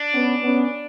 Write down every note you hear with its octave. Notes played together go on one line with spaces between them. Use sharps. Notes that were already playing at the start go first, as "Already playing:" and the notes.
Already playing: D4
B3 C#4
B3 C#4